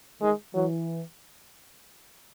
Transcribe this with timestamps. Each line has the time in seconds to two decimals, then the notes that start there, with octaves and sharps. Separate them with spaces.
0.22 D#3 G#3
0.54 E3 F#3